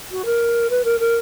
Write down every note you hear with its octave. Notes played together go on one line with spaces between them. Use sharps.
F#4
A#4
B4
A#4
A#4